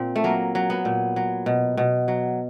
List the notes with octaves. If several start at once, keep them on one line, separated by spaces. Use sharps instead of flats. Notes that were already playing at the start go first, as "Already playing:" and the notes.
Already playing: A#2 C4
A3
F#3 A#3
F#3
B3
A#2
F#3
B2
B2
F#3